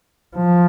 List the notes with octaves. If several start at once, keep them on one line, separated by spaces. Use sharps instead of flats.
F3